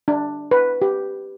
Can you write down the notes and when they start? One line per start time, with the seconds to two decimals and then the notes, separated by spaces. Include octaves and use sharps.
0.08 D4
0.51 B4
0.82 G4